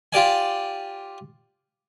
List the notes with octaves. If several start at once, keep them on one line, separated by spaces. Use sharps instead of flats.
F4 G4 D5 G#5